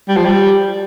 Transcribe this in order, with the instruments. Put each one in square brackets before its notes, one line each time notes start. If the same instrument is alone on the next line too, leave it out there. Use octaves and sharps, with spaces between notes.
[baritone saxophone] G3
F3
G3